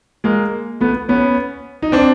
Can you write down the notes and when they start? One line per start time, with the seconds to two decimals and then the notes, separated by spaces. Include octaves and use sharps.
0.24 G#3 A#3
0.81 A3 B3
1.09 B3 C#4
1.82 D#4
1.92 C4 D4